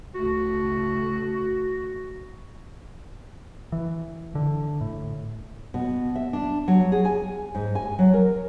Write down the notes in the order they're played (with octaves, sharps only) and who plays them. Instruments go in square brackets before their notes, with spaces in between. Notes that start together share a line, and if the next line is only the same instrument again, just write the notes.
[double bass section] C#2 A2 A3 [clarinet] F#4
[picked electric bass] E3
D3
A2
[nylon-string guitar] B2
E5
D4
F#3
G#4
G#5
G#2
G#5
F#3
A#4